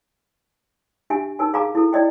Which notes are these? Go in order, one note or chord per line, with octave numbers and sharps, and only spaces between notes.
D4 G4 E5 G#5
D#4 A#4 G#5
G#4 F5 G#5 A#5 D6
E4 A4
E4 D5 D#5 G5